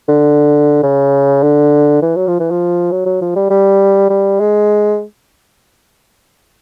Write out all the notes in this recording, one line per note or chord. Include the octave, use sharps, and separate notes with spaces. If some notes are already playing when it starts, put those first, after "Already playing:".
D3
C#3
D3
E3
F#3
F3
E3
F3
F#3
F#3
F3
G3
G3
G3
G#3